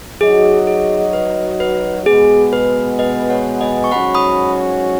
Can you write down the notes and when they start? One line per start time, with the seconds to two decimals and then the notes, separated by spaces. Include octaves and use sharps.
0.21 F#3 D#4 F#4 G#4 D#5
0.67 G#4
1.13 B4
1.60 B4
2.06 B2 G#3 B3 G#4
2.53 B4
2.99 B4 D#5
3.30 C#5 F#5
3.61 D#5 G#5
3.84 C#6
3.91 G#2 F#3 C#4 F#4 F#5 B5
4.15 B5 D#6